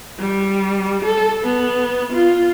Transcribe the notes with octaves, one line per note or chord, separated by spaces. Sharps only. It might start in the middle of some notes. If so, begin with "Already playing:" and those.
G3
A4
B3
F4